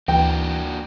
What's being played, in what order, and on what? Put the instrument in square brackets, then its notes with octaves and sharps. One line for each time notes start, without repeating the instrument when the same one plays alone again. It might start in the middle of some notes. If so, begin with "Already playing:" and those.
[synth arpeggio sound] D2 [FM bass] E3 [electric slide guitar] A#3 D4 F#4 [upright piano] G5